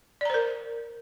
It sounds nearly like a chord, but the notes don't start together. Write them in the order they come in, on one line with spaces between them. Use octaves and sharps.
D5 A#5 C5 A#4